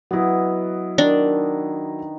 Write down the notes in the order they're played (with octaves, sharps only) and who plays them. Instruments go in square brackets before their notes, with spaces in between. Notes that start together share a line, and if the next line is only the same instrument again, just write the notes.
[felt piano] F#3 E4 [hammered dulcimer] B3 D#5
[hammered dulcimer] D#3 [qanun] D4